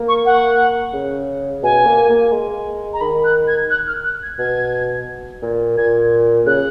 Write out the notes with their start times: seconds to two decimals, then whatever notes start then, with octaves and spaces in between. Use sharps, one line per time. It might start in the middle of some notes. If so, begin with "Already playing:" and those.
Already playing: A#3
0.08 C#6
0.25 F#5
0.94 C#3
1.63 B2 G#5
1.86 A#3
2.10 A#3
2.32 G#3
2.93 A#5
3.01 D#3 B5
3.24 F#6
3.48 G#6
3.70 F#6
3.87 F6
4.04 F#6
4.23 G#6
4.39 B2 G#6
5.42 A#2
5.78 A#2 G#6
6.46 C#3 F#6